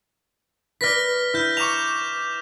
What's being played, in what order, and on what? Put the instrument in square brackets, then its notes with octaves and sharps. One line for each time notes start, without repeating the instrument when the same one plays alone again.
[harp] B4 D5 [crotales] F6 A#6 B6
[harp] E4 [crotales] F6 G6
[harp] A#5 C#6 [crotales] D6 E7 F7